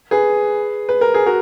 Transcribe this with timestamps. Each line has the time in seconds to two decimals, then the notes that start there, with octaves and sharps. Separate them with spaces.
0.11 G#4 B4
0.89 B4
1.01 A#4
1.14 G#4
1.26 F#4 A#4